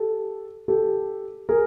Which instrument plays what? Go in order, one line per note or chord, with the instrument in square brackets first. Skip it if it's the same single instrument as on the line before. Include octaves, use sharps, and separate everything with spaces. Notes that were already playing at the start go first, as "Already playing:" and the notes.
Already playing: [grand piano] G4 A4
G4 A4
G#4 A#4